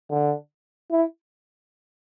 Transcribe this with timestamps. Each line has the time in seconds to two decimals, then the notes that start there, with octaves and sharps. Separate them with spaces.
0.10 D3
0.91 E4